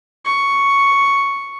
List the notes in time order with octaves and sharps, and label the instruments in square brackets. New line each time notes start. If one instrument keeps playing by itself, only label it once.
[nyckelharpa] C#6